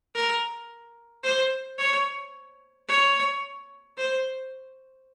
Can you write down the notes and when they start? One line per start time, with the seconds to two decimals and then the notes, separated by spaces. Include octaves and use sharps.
0.15 A#4
1.24 C5
1.78 C#5
2.89 C#5
3.98 C5